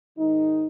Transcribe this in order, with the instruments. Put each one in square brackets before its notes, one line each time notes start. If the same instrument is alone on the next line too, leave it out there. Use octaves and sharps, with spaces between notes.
[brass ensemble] G#2 D#3 G#3 D#4